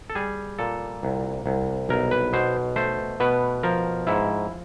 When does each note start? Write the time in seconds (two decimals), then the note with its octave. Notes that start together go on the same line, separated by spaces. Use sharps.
0.10 A4
0.15 G3 G#4
0.59 A#2 A4
1.03 C2
1.46 C2
1.89 B1 A#4
2.11 B4
2.33 B2 C5
2.76 A3 C5
3.20 B2 B4
3.63 F3 A#4
4.07 G#2 E4